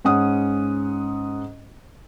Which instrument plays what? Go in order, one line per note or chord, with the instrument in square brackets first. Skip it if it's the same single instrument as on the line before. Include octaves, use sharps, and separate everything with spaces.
[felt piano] G#2 C#4 F#5 D#6